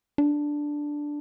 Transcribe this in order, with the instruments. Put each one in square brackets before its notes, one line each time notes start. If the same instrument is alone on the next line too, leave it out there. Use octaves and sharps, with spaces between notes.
[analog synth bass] D4